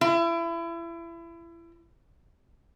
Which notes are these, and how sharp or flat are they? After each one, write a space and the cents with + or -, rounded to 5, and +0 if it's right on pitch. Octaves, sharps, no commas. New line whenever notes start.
E4 +30